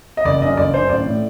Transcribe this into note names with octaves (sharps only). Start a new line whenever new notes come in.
D#5
F#1 D5
F#2 D3 D#5
F#1 D5
F#2 D3 C5
A1 D5
A2